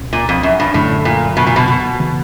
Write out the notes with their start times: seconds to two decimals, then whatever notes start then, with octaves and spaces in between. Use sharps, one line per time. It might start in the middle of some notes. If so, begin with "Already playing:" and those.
Already playing: C#2 B2 C#4
0.13 A#2
0.29 F2
0.43 F#2
0.60 G2
0.74 F#2 A2 D3 F#3
1.05 A#2
1.37 B2
1.47 A#2
1.56 B2
1.68 B2
1.99 C#3 E3